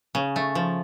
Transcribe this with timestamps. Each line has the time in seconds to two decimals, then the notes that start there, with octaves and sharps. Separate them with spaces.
0.15 C#3
0.36 A3
0.55 F3